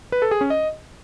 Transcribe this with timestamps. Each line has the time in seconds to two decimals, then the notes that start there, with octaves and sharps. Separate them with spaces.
0.12 B4
0.22 A4
0.31 G#4
0.41 C#4
0.50 D#5